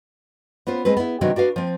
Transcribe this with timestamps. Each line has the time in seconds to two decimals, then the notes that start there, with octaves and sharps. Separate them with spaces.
0.67 B3 C#4 F4 C5
0.85 G#3 C4 B4
0.97 B3 E4
1.21 C3 D#3 F#3 B3 D4
1.36 D4 F#4 B4 F5
1.56 F3 C4